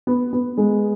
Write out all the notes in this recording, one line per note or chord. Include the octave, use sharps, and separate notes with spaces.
B3
B3
G#3